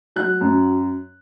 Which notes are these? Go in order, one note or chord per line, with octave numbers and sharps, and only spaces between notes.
F#3 F#6
F#2